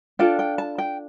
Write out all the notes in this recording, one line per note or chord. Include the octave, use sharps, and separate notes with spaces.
D4 F4 A4 G5
G5
A5
G5